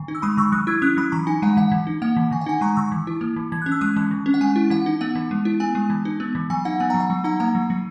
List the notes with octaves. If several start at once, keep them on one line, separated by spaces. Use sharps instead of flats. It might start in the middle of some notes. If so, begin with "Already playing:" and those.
Already playing: D#3
D#4
E6
G#3 B5 D#6
D#3 C#6 E6
F#3 D#6 F#6
E4 E6 G#6
C#4 D#6 F#6
F#3 B5 D#6
E3 A#5 C#6
D#4 G#5 B5
G#3 F#5 A#5
E3 F#5
E3
D#4
A#3 F#5
E3
D#3 G#5
F#5
D#4 G#5
G#3 A#5 C#6
D#3 C#6 E6
E3
E4
A#3
E3
E3 G#6
C#4 F#6
E6
G#3 D#6 F#6
E3
D#3
C#4
F#5
G#3 G#5
E4
E3 F#5
D#4
B3 F#5
E3
G#3
E4
B3 G#5
G#3
E3
D#4
B3
E3
F#3 G#5
D#4 F#5
B3 G#5
F#5 A#5
F#3
F#5
F#3
D#4 F#5 A#5
A#3 F#5 A#5
F#3
F#3